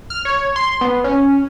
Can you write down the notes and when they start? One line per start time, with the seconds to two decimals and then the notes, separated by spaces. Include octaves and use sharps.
0.10 F6
0.25 C#5
0.56 C6
0.81 B3
1.04 C#4